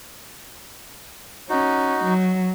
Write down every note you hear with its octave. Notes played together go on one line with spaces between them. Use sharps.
C#4 D#4 F#4
F#3